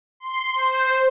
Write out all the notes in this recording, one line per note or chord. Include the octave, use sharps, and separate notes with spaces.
C6
C5